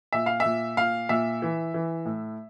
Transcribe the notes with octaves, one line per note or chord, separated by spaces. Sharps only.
A#2 E5
F5
A#2 E5
A#2 F5
A#2 E5
E3
E3
A2